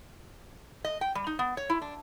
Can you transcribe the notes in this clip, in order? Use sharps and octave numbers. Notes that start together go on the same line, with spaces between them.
D#5
G5
G3
D#4
B3
C#5
E4
D4